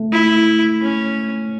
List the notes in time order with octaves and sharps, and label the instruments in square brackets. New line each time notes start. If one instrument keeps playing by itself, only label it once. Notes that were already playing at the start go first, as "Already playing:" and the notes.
Already playing: [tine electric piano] A3
[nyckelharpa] E4
C#4